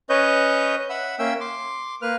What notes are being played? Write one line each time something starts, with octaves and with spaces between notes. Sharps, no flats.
C#4 B4 C#5 D#5 G6
E5 F#5 B5 E6
A#3 C#4 E5 G5 E6
C6 D6
A#3 B4 F6